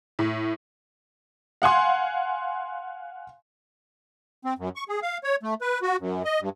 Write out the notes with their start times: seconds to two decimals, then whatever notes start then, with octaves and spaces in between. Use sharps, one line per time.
0.19 A2
1.62 F5 F#5 G#5 C6
4.45 C4
4.58 F#2
4.76 C#6
4.89 G#4
5.02 F5
5.24 C#5
5.43 A3
5.61 B4
5.82 F#4
6.00 F#2
6.25 D#5
6.40 G2